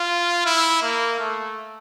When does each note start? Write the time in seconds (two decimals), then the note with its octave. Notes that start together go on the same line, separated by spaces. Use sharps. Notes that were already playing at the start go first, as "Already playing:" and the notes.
Already playing: F4
0.46 E4
0.82 A#3
1.19 A3